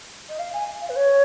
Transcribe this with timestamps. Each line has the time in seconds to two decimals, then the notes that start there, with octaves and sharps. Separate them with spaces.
0.29 D#5
0.39 F5
0.53 G#5
0.81 F5
0.89 B4
0.96 C#5